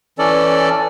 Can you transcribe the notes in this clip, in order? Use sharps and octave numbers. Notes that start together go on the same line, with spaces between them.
E3 C#4 A4 D5